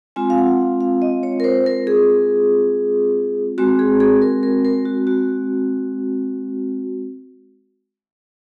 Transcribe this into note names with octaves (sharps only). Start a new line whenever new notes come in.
G#3 C4 F4 G#5
F5
F#5
F5
D#5
C#5
A#4
C5
A#4
G#4
G#3 C4 F#4
G#4
G#4
A#4
A#4
A#4
F#4
F#4